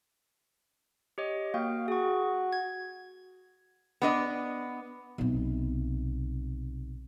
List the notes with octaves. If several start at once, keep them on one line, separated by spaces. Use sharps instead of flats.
G4 C#5 D#5
A#3 F#4 F5 G5
F#4 G#4 C#6
G#6
B3 D4 D#5
B1 C3